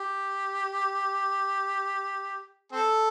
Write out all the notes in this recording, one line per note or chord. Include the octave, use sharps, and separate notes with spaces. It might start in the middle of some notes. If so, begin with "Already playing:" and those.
Already playing: G4
C4 A4